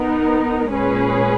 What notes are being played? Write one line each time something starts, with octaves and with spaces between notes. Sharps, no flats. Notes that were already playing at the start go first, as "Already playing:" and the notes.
Already playing: B3 D#4 A#4
A#2 G#3 C#4 G#4 B4